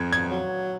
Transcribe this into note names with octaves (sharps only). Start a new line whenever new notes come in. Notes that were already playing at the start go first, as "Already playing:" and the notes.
Already playing: F2 G#6
G#6
F#3